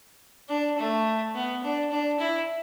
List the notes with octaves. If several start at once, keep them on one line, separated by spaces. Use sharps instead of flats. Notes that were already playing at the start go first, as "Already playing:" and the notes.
D4
A3
B3
D4
D4
E4